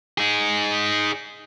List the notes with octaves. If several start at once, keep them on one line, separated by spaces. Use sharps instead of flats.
D#4 G#4